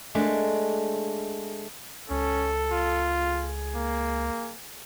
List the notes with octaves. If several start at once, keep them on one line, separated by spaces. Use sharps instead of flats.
G#3 A3 D4
C#2 C#4 A4
F4
G#4
A#3